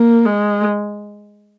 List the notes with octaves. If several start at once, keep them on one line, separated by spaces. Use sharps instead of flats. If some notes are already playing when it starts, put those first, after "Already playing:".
Already playing: A#3
G#3